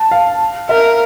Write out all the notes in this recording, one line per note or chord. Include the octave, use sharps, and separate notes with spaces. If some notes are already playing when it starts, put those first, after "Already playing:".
Already playing: A5
F5
A#4 E5